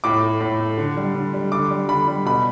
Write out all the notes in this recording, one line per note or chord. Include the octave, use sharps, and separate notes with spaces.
A2 D6
A3
A2
A3
D3
G3
D3
G3
D3 D6
G3
D3 B5
G3
B2 B5